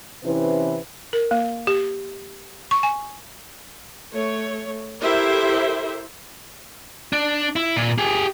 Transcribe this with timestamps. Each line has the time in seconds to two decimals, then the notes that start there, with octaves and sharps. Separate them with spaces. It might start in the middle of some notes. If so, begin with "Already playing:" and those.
0.25 C3 E3 C#4 E4 B4 C5
1.13 A#4
1.31 A#3
1.67 G4
2.71 C#6
2.83 G#5
4.13 A3 C#5
5.02 E4 G4 A4 A#4 C5 E5
7.13 D4
7.56 E4
7.77 A#2
7.98 G4 G#4